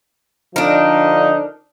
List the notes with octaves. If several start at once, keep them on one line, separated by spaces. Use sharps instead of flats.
D3 F3 D4 D#4 A#4